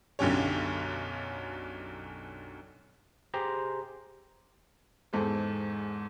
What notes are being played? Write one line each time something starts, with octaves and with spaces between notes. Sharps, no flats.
B1 F#2 D3 C#4 G4 C#5
G4 G#4 C5 A#5 C6
E2 G#2 A4 C5